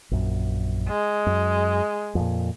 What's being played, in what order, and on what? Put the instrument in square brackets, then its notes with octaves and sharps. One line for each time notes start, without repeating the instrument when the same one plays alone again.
[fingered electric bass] A#1 F#2
[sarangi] G#3
[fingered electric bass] F#2
F2 A#2